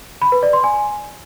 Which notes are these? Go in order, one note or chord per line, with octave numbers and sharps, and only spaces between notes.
B5
B4
D5
C6
G#5